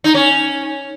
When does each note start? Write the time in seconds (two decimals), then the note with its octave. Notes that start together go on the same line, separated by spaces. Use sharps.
0.04 D#4
0.15 C#4